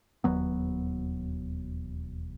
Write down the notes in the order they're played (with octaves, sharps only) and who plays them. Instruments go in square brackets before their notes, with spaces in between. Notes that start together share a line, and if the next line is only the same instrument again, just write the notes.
[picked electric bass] E1 D#2 F#3 B3